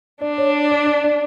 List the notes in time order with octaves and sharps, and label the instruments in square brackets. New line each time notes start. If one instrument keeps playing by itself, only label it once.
[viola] D4 [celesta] D5
[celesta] C#5
D5
D5
D5